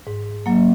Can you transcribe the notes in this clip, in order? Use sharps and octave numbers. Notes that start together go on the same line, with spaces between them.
G#2
F#3 A#3